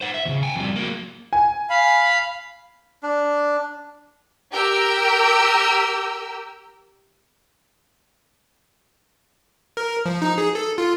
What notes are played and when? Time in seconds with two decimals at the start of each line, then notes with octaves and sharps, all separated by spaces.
0.01 C5 F#5
0.14 E5
0.25 D#2 C#3
0.43 G5 G#5
0.56 F2 G3
0.76 F#3 A#3
1.33 G#5
1.70 F5 B5
3.03 D4
4.52 G4 A#4 G5 E6
9.77 A#4
10.05 F3
10.22 D#4
10.38 G#4
10.55 A4
10.78 F4